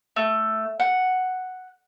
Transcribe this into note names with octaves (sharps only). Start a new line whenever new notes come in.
A3
F#5